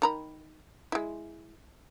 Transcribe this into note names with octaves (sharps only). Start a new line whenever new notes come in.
D#3 A#5 B5
G#3 E4